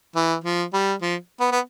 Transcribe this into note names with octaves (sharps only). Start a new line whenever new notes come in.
E3
F3
G3
F3
B3
B3